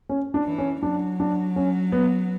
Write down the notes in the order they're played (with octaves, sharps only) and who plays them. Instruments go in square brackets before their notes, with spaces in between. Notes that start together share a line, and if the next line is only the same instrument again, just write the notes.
[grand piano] C#4
D4
[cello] E3
[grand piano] C#4
[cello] F#3 [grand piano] D4
[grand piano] D4
C#4
B3